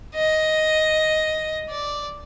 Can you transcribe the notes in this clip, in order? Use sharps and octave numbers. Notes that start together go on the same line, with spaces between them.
D#5
D5